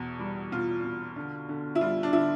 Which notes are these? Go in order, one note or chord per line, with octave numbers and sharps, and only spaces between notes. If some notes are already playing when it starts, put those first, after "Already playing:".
Already playing: E2 B2
G3
B2 F4
B2
D3
D3
E4
G3 F4
D4
D3 E4